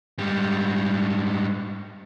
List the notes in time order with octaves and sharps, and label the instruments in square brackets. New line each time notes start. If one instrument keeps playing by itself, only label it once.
[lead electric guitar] G#2 G3